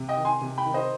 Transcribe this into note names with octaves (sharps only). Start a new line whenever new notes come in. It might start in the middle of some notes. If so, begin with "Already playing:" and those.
Already playing: C3
D#5 G5
D#3
G#5 C6
C3
G5 B5
D#3
C5 D#5